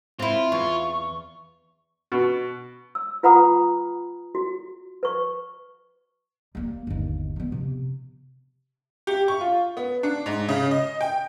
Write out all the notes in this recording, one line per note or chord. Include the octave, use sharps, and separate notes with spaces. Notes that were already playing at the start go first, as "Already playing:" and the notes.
C4 E4 F4
E2 C#6
B2
E6
F4 B4 F#5 A#5 B5 D#6
F#4
B4 C#6
G3 A#3
G1 D#2
F3 B3
C3
G4
C#6
F4
B3
D4
G#2
C#3
D#5
G5